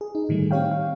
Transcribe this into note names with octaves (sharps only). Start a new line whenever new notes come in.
G#4
D#4
A2 D#3 G3 A3
C4 D#4 G4 C#5 F5 G5
F5